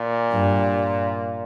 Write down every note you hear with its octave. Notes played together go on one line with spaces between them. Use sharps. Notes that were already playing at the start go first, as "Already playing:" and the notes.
Already playing: A#2
G2